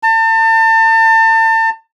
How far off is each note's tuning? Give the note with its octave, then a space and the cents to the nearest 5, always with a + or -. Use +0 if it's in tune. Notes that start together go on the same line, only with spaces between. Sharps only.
A5 +35